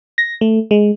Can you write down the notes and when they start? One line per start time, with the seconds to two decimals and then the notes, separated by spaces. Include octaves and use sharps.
0.18 A#6
0.41 A3
0.71 G#3